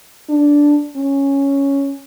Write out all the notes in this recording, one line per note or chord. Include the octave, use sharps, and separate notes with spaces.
D4
C#4